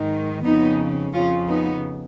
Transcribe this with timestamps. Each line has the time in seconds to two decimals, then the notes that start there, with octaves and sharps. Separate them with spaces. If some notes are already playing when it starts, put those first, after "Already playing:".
Already playing: G#2 D#3
0.45 F2 C#3 B3 D#4
1.13 F2 C#3 C#4 F4
1.48 B3 D#4